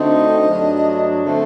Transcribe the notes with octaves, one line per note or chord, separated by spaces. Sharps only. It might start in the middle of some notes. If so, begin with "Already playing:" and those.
Already playing: D2 D3 A3 C4 D#4 D#5
G2 F#3 A3 D4
D3 A3 C4